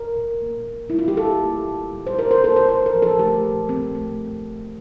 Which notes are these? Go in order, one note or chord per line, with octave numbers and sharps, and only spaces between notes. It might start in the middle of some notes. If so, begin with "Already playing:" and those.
Already playing: A#4
A#2
A#3
A#2
G3 E4
F4
G4
A#2 A4
A#3
A#2
G3
C5
A#2 A#4
C5
A#3 A4
C5
A#2 C5
A#4
F3
A4
A3 G4
A#2
A#2 C4
A3